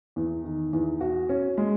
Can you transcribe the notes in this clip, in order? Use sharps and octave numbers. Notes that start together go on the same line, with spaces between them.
E2
D#3
E2
F#4
C#4
G#3